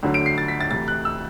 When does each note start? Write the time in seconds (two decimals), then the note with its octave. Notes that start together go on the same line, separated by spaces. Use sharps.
0.03 D2 D3 F#3
0.14 D7
0.26 C7
0.38 A6
0.48 B6
0.60 A6
0.71 D2 C3 E3 A6
0.88 F#6
1.05 E6